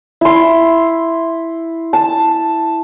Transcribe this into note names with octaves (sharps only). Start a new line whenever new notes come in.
E4 C6
A5